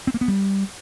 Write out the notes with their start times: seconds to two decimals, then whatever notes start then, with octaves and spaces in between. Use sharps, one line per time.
0.07 C4
0.14 A#3
0.21 B3
0.28 G3